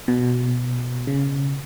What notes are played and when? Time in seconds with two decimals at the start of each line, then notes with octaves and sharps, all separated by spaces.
0.08 B2
1.07 C#3